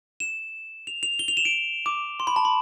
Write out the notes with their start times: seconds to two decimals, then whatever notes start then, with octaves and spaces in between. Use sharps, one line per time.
0.20 E7
0.87 F7
1.03 F7
1.19 G7
1.28 F7
1.37 E7
1.45 D7
1.86 D6
2.20 C6
2.27 B5
2.36 A5
2.45 B5